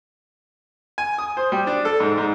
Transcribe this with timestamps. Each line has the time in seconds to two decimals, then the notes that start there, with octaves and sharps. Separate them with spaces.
0.98 G#5
1.18 D#6
1.37 C5
1.52 G3
1.67 D4
1.85 A4
2.00 G#2
2.18 G#2